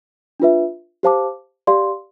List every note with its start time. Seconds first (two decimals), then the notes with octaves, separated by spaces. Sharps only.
0.40 D4 F4 B4 E5
1.03 G4 C5 F5 A5 D6
1.67 G4 D5 F5 C6